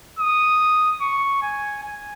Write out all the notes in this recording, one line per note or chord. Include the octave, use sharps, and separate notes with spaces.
D#6
C#6
G#5
G#5